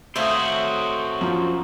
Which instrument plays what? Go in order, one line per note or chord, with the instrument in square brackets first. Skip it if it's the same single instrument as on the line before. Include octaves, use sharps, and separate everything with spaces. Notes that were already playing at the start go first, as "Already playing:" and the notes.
[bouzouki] A3 C#5 F5 [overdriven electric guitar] C4 F#4 [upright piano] C5 D#6
[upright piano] F#2 [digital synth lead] F3